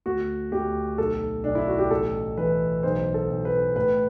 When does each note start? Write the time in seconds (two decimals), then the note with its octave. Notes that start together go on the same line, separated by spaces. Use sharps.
0.06 D2 F#4
0.52 D2 G4
0.98 B1 A4
1.44 B1 D4
1.55 E4
1.67 F#4
1.79 G4
1.91 A1 A4
2.37 E3 B4
2.83 B1 C5
3.14 A4
3.30 B1
3.45 B4
3.76 A2 B4